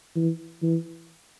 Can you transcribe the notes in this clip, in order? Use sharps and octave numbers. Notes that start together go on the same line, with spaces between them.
E3
E3